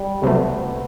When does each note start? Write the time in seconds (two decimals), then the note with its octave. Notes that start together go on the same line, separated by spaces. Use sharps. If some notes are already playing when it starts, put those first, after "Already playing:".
Already playing: G3
0.22 C2 C3 F#3 A3 B3